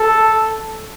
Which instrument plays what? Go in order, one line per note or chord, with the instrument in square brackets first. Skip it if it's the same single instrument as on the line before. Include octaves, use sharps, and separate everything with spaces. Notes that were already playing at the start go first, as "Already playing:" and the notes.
Already playing: [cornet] A4